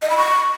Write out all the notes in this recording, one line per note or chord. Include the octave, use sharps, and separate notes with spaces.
D#5
B5
C#6